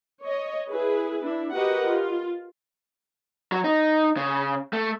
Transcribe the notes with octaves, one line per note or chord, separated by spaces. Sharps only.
C#5 D#5
E4 G#4 B4
D4 E4
F#4 G4 A#4 B4 D#5 F#5
F4
F#3
D#4
C#3
A3